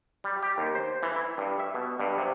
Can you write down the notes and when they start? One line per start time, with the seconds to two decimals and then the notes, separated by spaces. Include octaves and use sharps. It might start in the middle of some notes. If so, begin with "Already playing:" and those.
0.24 G3
0.43 G4
0.58 D#2
0.75 C5
1.03 E3
1.16 E4
1.38 G2
1.59 E5
1.75 B2
2.00 G2
2.18 C3